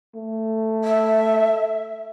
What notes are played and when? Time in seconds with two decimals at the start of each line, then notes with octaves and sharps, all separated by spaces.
0.15 A3
0.84 E5